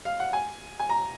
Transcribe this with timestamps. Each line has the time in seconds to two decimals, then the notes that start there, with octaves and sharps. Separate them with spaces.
0.05 F5
0.20 F#5
0.33 G#5
0.80 G#5
0.89 A#5